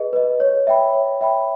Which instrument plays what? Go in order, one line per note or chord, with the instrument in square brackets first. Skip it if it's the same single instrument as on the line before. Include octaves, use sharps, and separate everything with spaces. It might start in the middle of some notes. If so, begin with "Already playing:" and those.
Already playing: [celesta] G#4 B4 D#5
B4 D#5
C#5
E5 G5 B5
C#5
E5 G5 B5